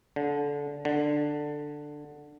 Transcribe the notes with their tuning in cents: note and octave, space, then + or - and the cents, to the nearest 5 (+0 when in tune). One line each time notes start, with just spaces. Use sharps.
D3 -20
D3 +10